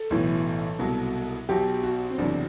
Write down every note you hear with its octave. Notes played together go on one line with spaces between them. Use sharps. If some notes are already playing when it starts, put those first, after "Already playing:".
Already playing: A4
B1 A2 E3
C2 B2 F#3
B1 B2 F#3 G4
F#4
C4
F#1 E2 C3 F#3 D4